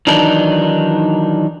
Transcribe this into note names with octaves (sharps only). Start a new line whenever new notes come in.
D#3 E3 F#3 D4 D#4